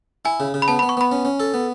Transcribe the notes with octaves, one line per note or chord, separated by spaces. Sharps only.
E4 G#5
C#3
C#3
B5
B3 A5
B3 B5
C#6
B3 B5
C#4
C#4
A4
B3